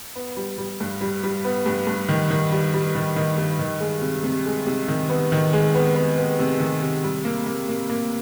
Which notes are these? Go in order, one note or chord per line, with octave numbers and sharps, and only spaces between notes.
B3
G3
G3
G2
G3
G3
B3
G2
G2
D#3
D#3
G3
G3
D#3
D#3
G2
D#3
G#3
C3
C3
G#3
C3
D#3
B3
D#3
G#3
B3
B3
B3
C3
D#3
C3
G3
A#3
A#3
A#3
A#3